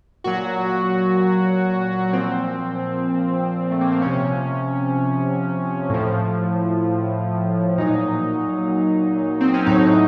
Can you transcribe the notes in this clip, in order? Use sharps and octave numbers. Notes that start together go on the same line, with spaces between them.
A#2 F#3 F#4
A#2 F3 C4
A3
A#3
C4
C3 F3 C#4
A2 F3
A#2 F#3 D#4
C4
C#4
A2 F#3 D#4